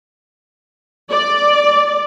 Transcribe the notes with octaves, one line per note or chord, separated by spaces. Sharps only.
D5